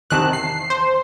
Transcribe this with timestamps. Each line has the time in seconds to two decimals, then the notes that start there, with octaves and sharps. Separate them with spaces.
0.10 E2 C3 D#3 G#5 A5 F#6
0.33 C7
0.70 C5